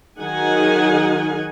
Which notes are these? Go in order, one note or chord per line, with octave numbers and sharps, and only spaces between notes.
D#3 F#3 D#4 G#4 F#5 G#5